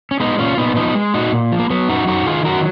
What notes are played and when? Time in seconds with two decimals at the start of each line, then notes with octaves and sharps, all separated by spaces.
0.11 C#4
0.20 G#3 B3 D#4
0.38 A#2 C#4 F4
0.57 A#2 B3 D#4
0.76 F3 B3 D#4
0.95 G#3
1.14 A#2 D#4 F#4
1.32 A#2
1.52 F3
1.59 A#3
1.70 F#3 B3
1.89 F#2 D#4 F#4
2.07 F#2 D#4 F#4
2.26 D#3 F4 G#4
2.45 F#3 F#4 A#4